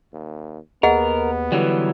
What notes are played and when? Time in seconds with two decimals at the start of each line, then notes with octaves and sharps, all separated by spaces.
0.13 D#2
0.83 D#2 B3 G#4 A#4 D#5 F#5
1.52 D3 E3 F#3 G3